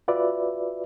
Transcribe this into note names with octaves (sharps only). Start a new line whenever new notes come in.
F4 F#4 B4 D5 E5